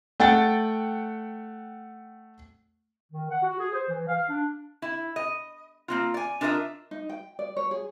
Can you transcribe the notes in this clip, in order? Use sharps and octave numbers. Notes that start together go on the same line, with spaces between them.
A3 F#5 G5 A6
D#3
F#5
F#4
G#4
C5
E3
F5
D4
E4
D#5
A#3 C4 F4
D5 G#5
D4 F4 A#4 B4 D#5 E5
D#4
G5
D5
C#5
G#4